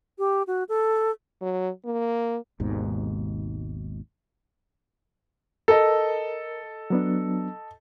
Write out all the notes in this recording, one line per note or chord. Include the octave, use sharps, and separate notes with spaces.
G4
F#4
A4
F#3
A#3
G#1 D#2 G#2 B2
A4 A#4 D#5
F#3 B3 D4